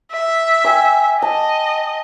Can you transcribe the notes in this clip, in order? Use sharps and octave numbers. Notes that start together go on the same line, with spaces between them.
E5
G5 G#5 D6
D#5 A5